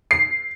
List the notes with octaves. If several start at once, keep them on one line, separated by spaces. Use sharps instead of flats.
C7